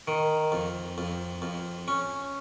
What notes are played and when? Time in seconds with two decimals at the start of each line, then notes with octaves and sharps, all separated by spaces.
0.08 D#3
0.52 F2
0.98 F2
1.42 F2
1.88 C#4